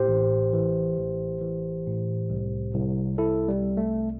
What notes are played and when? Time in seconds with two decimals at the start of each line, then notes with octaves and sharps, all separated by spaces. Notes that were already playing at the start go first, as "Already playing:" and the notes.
Already playing: A2 G4 C5
0.08 A1
0.53 E3
0.97 A1
1.41 E3
1.86 A2
2.30 C2
2.75 C2
3.18 C2 E4 A4
3.48 G3
3.63 C3
3.77 A3